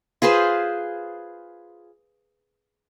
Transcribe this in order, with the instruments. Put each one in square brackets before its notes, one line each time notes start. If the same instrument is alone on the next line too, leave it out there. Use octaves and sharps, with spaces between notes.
[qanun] F4 G#4 B4 C5